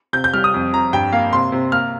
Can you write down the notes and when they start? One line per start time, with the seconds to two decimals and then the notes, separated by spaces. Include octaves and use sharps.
0.13 C3 G6
0.24 G6
0.34 G3 F6
0.44 D#6
0.54 F2
0.73 F2 A#5
0.93 G2 G5
1.12 A#3 F5
1.33 C3 C6
1.52 C3
1.72 A#3 F6